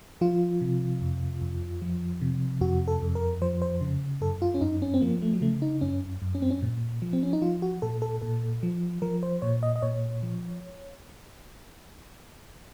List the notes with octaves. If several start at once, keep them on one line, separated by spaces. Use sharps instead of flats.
F3 F4
C3
F2
F2
F3
C3
F2 F#4
A4
F2
A#4
F3 C5
C5
C#3
F#2 A4
F4
C#4
F#2 D#4
C#4
C4
F3 A#3
A3
F#3
C#3 A3
D#4
F#2 C#4
F#2
C#4
C4
C#4
A#2
F3
C4
C#4
D#4
F3 F4
F#4
A#2 A4
A4
A#2 A4
F3
F3 A#4
C5
A#2 C#5
D#5
D#5
A#2 C#5
F3